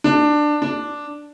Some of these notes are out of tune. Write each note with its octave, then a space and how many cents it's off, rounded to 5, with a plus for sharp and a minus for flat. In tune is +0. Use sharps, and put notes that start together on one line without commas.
D4 +15
D4 +0